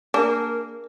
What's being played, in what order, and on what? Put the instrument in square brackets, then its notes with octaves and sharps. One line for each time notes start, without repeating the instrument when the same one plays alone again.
[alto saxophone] A#3 [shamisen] D4 [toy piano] G#4 A#4 G#5